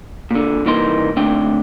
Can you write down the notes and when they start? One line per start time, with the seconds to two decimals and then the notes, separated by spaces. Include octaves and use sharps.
0.31 A#2 D3
0.66 C2 E3 A#3 D#4 C6
1.16 D2 C4 D4 G5